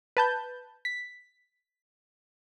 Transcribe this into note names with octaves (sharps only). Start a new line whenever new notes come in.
B4 A5 G6
B6